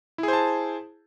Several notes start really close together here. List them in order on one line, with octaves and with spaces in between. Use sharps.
E4 G#4 C5 A5